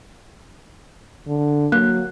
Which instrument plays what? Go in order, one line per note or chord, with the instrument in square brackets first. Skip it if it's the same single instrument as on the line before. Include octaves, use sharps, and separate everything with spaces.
[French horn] D3
[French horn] F#3 [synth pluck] A#3 [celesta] F#6